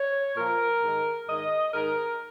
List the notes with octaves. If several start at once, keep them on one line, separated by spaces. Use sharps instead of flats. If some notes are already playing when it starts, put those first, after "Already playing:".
Already playing: C#5
A#2 F3 A#4
G#2 D#3
G#2 D#3 D#5
G#2 D#3 A#4